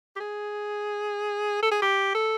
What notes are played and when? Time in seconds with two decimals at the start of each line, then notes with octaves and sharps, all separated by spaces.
0.16 G4
0.20 G#4
1.62 A4
1.72 G#4
1.82 G4
2.15 A4